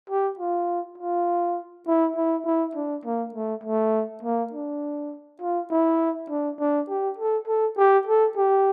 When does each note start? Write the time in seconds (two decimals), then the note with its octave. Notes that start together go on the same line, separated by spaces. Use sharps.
0.10 G4
0.39 F4
0.98 F4
1.87 E4
2.16 E4
2.45 E4
2.75 D4
3.05 A#3
3.34 A3
3.63 A3
4.23 A#3
4.52 D4
5.41 F4
5.71 E4
6.29 D4
6.59 D4
6.89 G4
7.18 A4
7.47 A4
7.77 G4
8.07 A4
8.37 G4